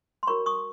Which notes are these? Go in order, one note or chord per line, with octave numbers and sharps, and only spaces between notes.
C6
F#4 A#4 C#5 B5 C#6
C#6 D#6